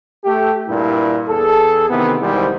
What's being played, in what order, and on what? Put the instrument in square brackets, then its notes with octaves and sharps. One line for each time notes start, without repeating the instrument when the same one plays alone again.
[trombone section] A3 G4
G2 A#2 E4
E2 G#4 A4
C3 D#3 E3 B3
G#1 G#2 C3 E3 G3